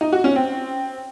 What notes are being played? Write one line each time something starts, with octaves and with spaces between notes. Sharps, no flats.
D#4
F#4
C#4
C4